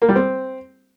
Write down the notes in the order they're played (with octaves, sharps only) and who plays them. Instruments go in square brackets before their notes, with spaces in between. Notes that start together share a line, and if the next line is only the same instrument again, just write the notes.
[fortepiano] A#3
G3
C4